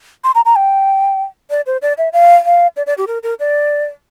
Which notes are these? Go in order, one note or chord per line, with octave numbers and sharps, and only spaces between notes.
C6
A#5
A#5
G5
D5
C5
D5
E5
F5
F5
D5
D5
G4
A#4
A#4
D5